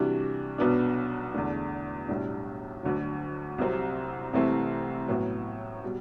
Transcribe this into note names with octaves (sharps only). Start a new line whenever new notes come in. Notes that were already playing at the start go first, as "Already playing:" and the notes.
Already playing: C3 E3 G3 D4 F#4
B1 B2 F#3 B3 D4
E2 D3 A3 D4
B1 A2 G3 D4
D2 D3 F#3
C2 C3 F#3 C4
C2 C3 E3 A3 C4
A1 A2 F#3 B3
B2 G3